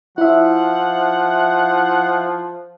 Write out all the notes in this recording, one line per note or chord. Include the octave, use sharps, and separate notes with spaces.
F3 E4 E5 F#5